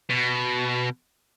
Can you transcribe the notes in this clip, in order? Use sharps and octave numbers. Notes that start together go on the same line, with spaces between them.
B2